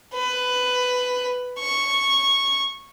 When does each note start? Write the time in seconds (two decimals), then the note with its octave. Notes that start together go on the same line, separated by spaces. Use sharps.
0.14 B4
1.59 C#6